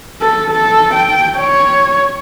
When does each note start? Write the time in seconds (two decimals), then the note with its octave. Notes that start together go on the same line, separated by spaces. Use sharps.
0.21 A4
0.51 A4
0.94 G5
1.38 C#5